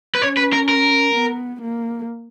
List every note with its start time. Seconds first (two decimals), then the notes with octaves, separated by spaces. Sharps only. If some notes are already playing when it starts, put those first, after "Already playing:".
0.15 B4
0.22 C#4 C#5
0.37 B4
0.53 A#4
0.69 A#4
1.14 B3
1.61 A#3